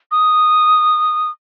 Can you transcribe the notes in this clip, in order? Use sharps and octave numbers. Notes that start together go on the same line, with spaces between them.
D#6